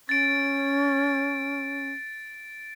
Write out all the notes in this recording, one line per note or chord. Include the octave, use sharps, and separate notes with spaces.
C#4 A6 D7